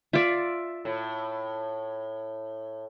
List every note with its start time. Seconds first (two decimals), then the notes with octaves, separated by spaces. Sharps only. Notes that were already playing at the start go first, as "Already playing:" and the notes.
0.13 F4 D5 E5
0.85 A2